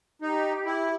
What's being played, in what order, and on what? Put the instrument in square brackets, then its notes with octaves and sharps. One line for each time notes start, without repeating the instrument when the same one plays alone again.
[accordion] D#4 [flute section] G4
[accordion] E4